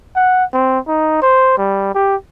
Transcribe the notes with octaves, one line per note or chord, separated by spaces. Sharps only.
F#5
C4
D#4
C5
G3
G4